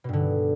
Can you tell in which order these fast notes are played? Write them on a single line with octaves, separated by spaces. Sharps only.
B2 G2 D3